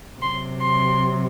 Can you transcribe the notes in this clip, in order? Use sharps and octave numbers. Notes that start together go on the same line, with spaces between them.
C3 F#3 C6
C6